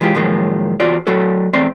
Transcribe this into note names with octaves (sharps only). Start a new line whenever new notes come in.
E3 G#3 F4 G4
A2 D#3 F3 F#3 G#3 A#3
E2 F4 F#4 C5 D5
F#3 A3 F#4 A4
E2 A3 C4 D5 C6